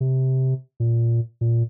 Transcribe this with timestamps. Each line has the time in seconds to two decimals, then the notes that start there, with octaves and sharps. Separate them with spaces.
0.01 C3
0.80 A#2
1.41 A#2